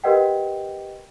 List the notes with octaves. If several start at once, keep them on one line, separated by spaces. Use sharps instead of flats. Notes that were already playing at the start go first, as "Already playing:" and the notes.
G4 A#4 B4 D#5 F#5 G5